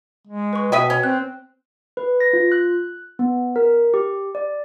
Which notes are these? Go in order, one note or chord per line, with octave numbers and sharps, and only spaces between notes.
G#3
B4 C#6
B2 B4 D#5 E5 G5 B6
C#4
C4 F#6
B4
A#6
F4
F#6
B3
A#4
G4
D5